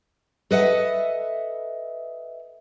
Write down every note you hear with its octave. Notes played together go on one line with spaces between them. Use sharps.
A4 B4 D#5 E5 F#5